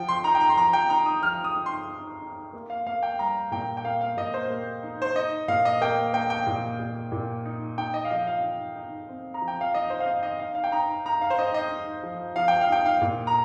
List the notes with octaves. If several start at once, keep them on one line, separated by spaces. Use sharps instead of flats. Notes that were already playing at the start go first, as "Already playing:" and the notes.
Already playing: F3 G5
C6
D#4 A#5
G5
A#5
C6
F3 A#5
G5
D#4 A#5
D#6
F3 F6
D#6
D#4
C6
D#4
D#4
A#3
F5
A#3 F5
G5
G3 A#5
A#2 G5
G5
A#3 F5
F5
A#2 D#5
C5
A#3
D#4
C5
D#4 D#5
A#2 F5
D#5
A#3 G5
A#3 G5
G5
A#2
A#2
A#2
D#4
D#4 G5
D#5
F5
F3 D#5
F5
D#4
D#4
C4
A#5
F3
G5
F5
D#4 D#5
C5
F5
D#4 D#5
D#5
D#4 F5
F5
G5
D#4 A#5
D#4 A#5
F5
C5
D#4 D#5
D#5
D#4
F3
F3 F5
G5
F5
D#4 G5
F5
A#2
A#5